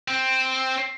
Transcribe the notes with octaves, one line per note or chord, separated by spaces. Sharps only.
C4